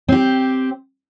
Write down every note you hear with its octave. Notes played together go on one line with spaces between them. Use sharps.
C4 G4